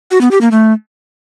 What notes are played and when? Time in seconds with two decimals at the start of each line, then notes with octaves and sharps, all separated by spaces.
0.11 F#4
0.21 B3
0.31 G4
0.41 A#3
0.51 A3